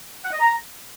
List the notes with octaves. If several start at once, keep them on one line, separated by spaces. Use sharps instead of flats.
F#5
D#5
A#5